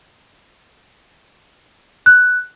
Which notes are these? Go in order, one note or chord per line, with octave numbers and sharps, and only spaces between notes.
F#6